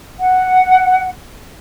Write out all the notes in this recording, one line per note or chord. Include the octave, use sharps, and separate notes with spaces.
F#5